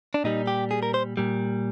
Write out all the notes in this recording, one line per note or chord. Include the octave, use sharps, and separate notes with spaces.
D4
A#2 G3 D#4
G4
G#4
A#4
C5
A#2 G3